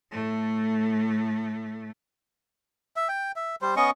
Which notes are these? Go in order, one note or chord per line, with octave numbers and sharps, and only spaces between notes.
A2 A3
E5
G5
E5
G3 C5
B3 C#4 D#5 C#6